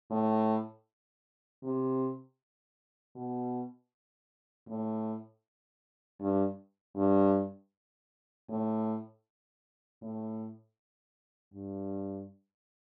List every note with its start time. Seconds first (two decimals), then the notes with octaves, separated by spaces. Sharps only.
0.11 A2
1.63 C3
3.15 B2
4.68 A2
6.21 G2
6.96 G2
8.50 A2
10.02 A2
11.53 G2